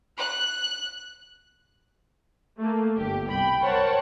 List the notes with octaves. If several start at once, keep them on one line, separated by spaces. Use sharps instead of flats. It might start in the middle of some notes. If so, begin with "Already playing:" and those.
F#6
A3 A#3
G1 G4
C2 G5 B5
A#4 C5 C#5 F#5 G5 A5